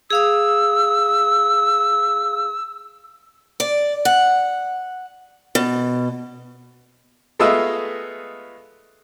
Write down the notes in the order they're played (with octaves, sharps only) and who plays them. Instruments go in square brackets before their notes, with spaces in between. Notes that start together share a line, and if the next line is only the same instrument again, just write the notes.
[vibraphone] G#4 F5 D#6 [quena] E6
[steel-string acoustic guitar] D5
F#5
B2
[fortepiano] G#3 A3 B3 F4 D#5 E5